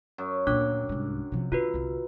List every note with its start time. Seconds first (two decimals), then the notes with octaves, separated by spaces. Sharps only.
0.18 F#2
0.47 D2 A#2 D4 D6 F#6
0.89 C2 G#2
1.32 C3 F3
1.52 D3 F4 F#4 B4
1.74 C2 D3